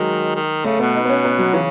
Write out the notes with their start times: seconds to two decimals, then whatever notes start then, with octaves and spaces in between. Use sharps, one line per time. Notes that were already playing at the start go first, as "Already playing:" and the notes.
Already playing: D#3 F#3 G#3
0.35 D#3
0.64 C#3 A3
0.79 B2 B3
0.94 D#4
1.05 B3
1.09 C#4
1.25 B3
1.39 F#3
1.54 C#3 E3